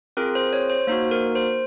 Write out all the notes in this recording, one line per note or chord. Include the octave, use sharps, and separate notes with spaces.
C4 F4 G#4 A#4
C5
C#5
C5
A#3 D#4 F#4 C5
A#4
C5